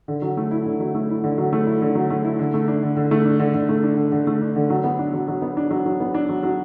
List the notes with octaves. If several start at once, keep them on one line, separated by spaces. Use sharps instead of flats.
D3
F#3
A3
E4
D3
F#3
A3
E4
D3
F#3
A3
E4
D3
F#3
A3
E4
D3
A3
D4
D3
D3
A3
D4
D3
D3
A3
D4
D3
D3
A3
D4
D3
F#3
B3
D4
F#3
F#3
B3
D4
F#3
F#3
B3
D4
F#3
F#3